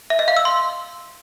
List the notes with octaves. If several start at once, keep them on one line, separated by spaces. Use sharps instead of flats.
E5
D#5
F5
E6
C6